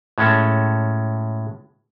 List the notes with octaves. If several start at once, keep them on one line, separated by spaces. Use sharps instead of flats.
A2 G#3 C#4 A4